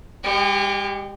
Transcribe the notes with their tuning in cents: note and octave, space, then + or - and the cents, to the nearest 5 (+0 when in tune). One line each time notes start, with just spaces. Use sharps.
G#3 -40 G4 +0